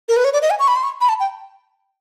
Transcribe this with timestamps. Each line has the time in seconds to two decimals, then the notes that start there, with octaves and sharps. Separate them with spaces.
0.09 A#4
0.17 B4
0.25 C#5
0.33 D5
0.42 D#5
0.50 G#5
0.59 C#6
0.68 B5
0.76 C6
0.83 C#6
1.01 B5
1.09 A5
1.20 G5